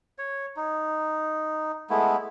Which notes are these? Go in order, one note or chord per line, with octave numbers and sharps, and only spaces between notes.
C#5
D#4
G#3 A3 B3 E4